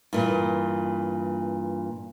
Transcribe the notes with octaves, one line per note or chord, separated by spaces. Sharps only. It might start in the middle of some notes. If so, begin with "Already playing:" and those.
G2 A#2 E3